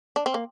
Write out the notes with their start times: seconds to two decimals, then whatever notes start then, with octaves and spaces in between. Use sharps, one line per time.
0.16 D4
0.26 C4
0.34 A#3